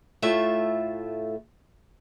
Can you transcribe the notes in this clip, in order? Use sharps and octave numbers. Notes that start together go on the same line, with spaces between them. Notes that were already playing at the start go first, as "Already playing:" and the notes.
A2 A3 F4 E5